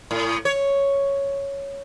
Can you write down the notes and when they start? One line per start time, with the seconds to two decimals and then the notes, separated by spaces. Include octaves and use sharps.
0.11 A2
0.45 C#5